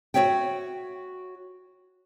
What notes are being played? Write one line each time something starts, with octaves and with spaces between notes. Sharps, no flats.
F#4 A4 C#5 E5 G5